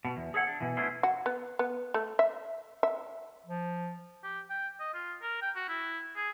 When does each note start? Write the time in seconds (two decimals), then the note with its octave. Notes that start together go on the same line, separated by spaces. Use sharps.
0.05 B2
0.17 E2
0.34 G#4 A4 C#5 F5 F#5
0.47 D4
0.60 B2 E3
0.77 A3 B3 C#4 D4 E4 C5
1.03 F#4
1.26 B3
1.59 B3
1.94 A3
2.19 E5
2.83 E5
3.46 F3
4.24 G4
4.50 G5
4.80 D#5
4.94 F4
5.22 A#4
5.42 G5
5.55 F#4
5.69 E4
6.16 G#4